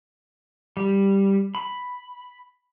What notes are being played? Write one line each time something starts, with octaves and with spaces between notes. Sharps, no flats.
G3
B5